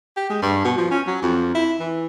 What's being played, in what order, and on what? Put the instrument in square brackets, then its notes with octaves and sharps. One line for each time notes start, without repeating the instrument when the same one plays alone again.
[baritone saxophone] G4
G#3
G2
B2
F3
C#4
F#3
F2
E4
E3